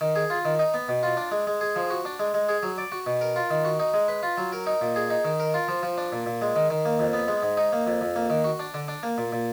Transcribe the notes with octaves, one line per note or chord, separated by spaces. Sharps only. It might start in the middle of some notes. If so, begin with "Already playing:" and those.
D#3
G#4
F4
D#3
D#4
B3
B2
F4
D4
G#3
G#3
G#4
F3
F#4
D4
G#3
G#3
G#4
F#3
D5
F#4
B2
A#4
F4
D#3
F#4
D#4
G#3
B4
F4
F#3
A#4
D#4
A#2
G#4
D#4
D#3
A#4
F4
F3
F3
D4
A#2
A#2
G#3
D#3
D#3
A#3
F2
B3
G#3
G#2
D#4
A#3
F2
F2
A#3
D#3
F#4
D4
D3
D4
A#3
A#2
A#2